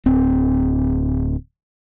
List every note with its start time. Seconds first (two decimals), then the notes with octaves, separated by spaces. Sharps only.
0.06 D1 C4